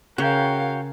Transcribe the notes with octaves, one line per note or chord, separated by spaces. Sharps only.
C#3 F#4 A#4 C#5 F5 G5